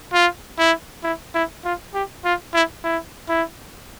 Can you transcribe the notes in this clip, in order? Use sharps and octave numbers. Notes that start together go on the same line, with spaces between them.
F4
E4
E4
E4
F4
G4
F4
E4
E4
E4